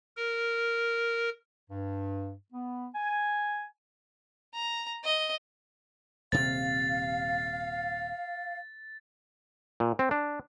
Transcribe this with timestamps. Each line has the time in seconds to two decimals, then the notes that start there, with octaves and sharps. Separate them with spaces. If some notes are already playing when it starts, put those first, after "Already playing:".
0.17 A#4
1.70 G2
2.53 B3
2.94 G#5
4.55 A#5
5.04 D#5
6.32 D#1 C3 C4 F5 A6
9.80 A#2
9.99 C4
10.11 D4